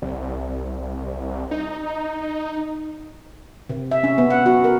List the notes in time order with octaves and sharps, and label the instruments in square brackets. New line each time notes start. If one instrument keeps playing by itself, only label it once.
[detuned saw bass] C2
D#4
[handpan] C3
E5
C#4
B3
F#5
F#4
A#4